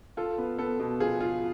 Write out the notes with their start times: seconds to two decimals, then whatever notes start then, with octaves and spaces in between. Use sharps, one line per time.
0.17 F4 A4
0.38 B3
0.59 B3 A4
0.80 B2
1.00 F4 G#4
1.21 F4